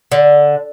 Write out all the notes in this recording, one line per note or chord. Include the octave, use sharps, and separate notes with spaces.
D3